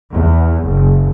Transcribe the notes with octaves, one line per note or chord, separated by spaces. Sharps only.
E2
F#1